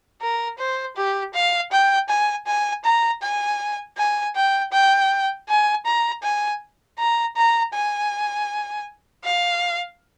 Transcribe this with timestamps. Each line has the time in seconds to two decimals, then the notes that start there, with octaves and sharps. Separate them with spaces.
0.21 A#4
0.59 C5
0.96 G4
1.34 F5
1.72 G5
2.09 G#5
2.47 G#5
2.85 A#5
3.22 G#5
3.98 G#5
4.36 G5
4.72 G5
5.49 G#5
5.86 A#5
6.23 G#5
6.99 A#5
7.36 A#5
7.74 G#5
9.25 F5